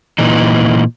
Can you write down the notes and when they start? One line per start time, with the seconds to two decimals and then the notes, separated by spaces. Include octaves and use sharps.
0.19 A#2 E3 D#4